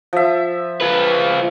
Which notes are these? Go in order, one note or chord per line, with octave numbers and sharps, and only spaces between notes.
F3 E5
F4 B4